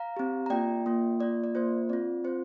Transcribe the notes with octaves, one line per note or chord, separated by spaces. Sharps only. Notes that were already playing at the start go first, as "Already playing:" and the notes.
Already playing: F5 A#5
C4 G4
A#5
A#3 F4 D5 G5
A#3 F4
A#3 F4 D5
D5
A#3 F4 C5
C4 F4 D5
C4 F4 C5